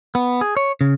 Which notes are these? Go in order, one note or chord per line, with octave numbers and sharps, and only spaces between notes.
B3
G#4
C#5
C#3